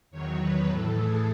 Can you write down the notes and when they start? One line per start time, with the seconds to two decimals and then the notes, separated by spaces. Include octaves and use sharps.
0.11 E2 D#3 F#3 C#5
0.39 B4
0.68 A2 E3 A4
0.96 G#4